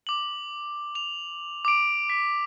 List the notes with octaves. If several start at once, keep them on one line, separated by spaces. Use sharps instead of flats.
D6 F#7
F7
D6 D7
B6